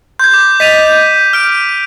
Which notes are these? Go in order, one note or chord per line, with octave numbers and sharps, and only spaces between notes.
C6 G6 G#6
D6
D#5 A6 B6 D#7 F7
G6
F6 D7